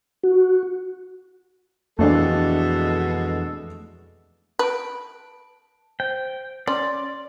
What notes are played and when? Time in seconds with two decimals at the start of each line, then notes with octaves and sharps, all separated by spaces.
0.23 F#4
1.99 F2 B2 E3 G#3 A3 D4 A4
4.59 B4 A5 D7
6.00 C5 G5
6.67 C#4 D5 C6